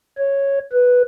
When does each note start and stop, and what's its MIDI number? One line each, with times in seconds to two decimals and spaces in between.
0.18 0.59 73
0.72 1.02 71